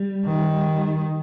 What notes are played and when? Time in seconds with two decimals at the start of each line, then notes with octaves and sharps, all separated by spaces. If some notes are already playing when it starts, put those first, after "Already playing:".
Already playing: G3
0.25 D#3